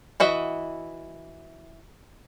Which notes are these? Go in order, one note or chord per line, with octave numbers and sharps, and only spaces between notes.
E3 F#4 D#5 E5